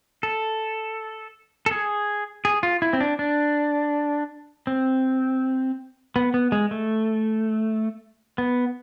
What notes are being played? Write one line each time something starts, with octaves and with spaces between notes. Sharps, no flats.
A4
A4
G#4
G#4
F4
E4
C4
D4
D4
C4
B3
B3
G#3
A3
B3